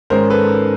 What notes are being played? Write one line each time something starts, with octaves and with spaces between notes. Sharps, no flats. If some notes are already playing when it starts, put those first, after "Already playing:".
G#2 D#3 G#3 C#4 A#4 C5
A4 B4